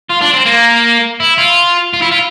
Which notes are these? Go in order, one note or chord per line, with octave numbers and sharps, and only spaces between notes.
F4
D4
C4
A#3
E4
F4
F4
E4
F4